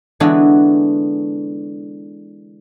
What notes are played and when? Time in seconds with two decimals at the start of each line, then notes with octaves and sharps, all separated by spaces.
0.20 D3 E3 G#3 B3 D4 F#4